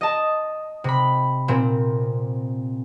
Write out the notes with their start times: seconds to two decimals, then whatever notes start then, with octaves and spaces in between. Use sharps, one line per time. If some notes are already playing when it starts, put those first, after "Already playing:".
0.01 D#5 A5
0.84 C3 B5
1.48 A#2 C4